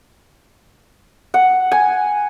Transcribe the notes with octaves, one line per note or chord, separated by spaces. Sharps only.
F#5
G#5